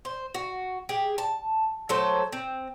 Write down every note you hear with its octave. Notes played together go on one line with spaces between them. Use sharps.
C5
F#4
G4 G#4
A5
F#3 A3 A4 C5
C4